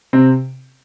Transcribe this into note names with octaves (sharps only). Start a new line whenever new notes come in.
C3 C4